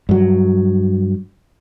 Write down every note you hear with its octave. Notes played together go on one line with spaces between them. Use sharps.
G2 F#3